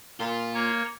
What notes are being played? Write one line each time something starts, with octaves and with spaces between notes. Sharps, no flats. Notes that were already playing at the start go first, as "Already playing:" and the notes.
A#2 F4
A#3 C#5